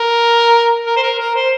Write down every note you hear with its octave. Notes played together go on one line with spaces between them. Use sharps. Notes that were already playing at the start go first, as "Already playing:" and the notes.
Already playing: A#4
A#4
C5
A#4
A#4
C5